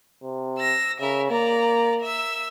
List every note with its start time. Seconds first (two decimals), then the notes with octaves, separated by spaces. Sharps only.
0.23 C3
0.58 E6 A#6
1.00 C#3 A#4 E5
1.31 A#3 D5 A#5
2.01 E5 E6